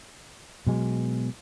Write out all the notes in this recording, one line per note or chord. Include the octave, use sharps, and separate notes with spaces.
B2 F#3 G#3